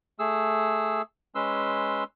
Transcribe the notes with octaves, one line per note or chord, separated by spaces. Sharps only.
A3 G#4 E6
G#3 C#4 B4 C6 E6